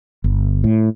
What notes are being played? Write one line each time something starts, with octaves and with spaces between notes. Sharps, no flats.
G1
A2